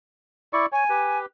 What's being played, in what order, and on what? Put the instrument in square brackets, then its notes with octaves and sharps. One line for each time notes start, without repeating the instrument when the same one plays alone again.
[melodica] E4 D5 C#6
[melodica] C#5 [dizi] G#5
[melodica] G4 B4